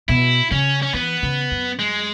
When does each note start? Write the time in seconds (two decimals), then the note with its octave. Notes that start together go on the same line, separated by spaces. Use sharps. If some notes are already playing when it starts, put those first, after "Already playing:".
0.09 B2 E4
0.52 C#3 C#4
0.82 C#4
0.94 E3 B3
1.23 C#3
1.51 F#2
1.79 G#3